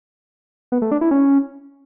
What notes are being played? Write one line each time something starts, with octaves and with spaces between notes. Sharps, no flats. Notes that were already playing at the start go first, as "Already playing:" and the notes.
B3
A3
D4
E4
C#4